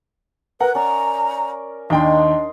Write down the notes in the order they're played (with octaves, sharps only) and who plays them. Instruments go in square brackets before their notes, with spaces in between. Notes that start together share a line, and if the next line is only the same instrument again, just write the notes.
[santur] A#4 [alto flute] B4 [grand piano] F#5
[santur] C#4 D5 C#6 [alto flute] A#5
[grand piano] D#2 G5 [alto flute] D4 [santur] D#4 C6